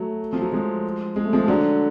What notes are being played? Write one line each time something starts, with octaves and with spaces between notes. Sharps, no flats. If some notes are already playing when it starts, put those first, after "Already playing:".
Already playing: F#3 A3
F3
F#3
F3 G#3
G#3
A3
F3 G#3
D3 F#3